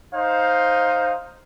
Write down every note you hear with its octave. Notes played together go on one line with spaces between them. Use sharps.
D#4 C5 F5